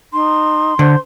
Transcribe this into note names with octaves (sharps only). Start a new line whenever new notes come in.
D#4 C6
D3 C5